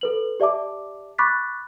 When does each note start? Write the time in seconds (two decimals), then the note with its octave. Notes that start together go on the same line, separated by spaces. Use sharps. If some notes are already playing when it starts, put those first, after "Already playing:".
0.01 A4 B4 F#7
0.40 G4 D5 E5 A5 D6
1.18 B5 C#6 D6 F#6 A6 B6